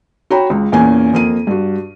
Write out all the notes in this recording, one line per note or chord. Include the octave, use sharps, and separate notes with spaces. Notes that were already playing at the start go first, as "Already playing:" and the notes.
F#4 C#5 G5 A#5 B5
C#2
E2 A#2 A#3 C#4 G#5
F2 A#3 D#7
G2 F#4